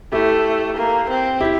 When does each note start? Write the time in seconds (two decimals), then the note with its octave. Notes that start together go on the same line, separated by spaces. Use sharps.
0.12 A3 E4 G4
0.76 A#3
1.09 C4
1.41 E4 G4